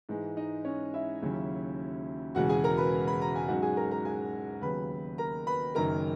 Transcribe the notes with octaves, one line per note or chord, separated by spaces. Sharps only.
G#2 E3 G#3
D#4 D#5
C#4 C#5
E4 E5
D#2 C#3 F#3 C#4
E1 E2 C#3 G#3 F#4 F#5
G#4 G#5
A#4 A#5
B4 B5
B5
A#5
G#5
G#2 F#3 C#4 F#4 F#5
G#4 G#5
A#4 A#5
A#4 A#5
G#4 G#5
D#2 C#3 F#3 B3 B4 B5
A#4 A#5
B4 B5
F#1 F#2 D#3 A#4 A#5